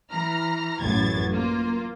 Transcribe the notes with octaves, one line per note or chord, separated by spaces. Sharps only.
E3 A#5 F6
A1 F#2 F#3 G#6 A6
A#3 F4